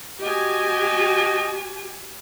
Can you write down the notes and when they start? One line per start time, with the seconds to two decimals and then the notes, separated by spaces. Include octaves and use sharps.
0.23 F#4 G4 D#5 G#5